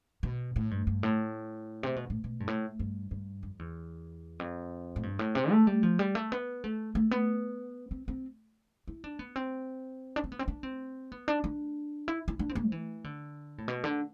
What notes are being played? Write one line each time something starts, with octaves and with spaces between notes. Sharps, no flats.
B2
A2
G2
G2
A2
C3
B2
A2
B2
G2
A2
G2
G2
F2
E2
F2
A2
G2
A2
C3
A3
G3
F3
G3
A3
B3
A3
A3
B3
C4
C4
E4
D4
B3
C4
D4
C4
B3
C4
D4
C4
B3
D4
D4
E4
E4
D4
C4
B3
F3
E3
D3
A2
B2
D3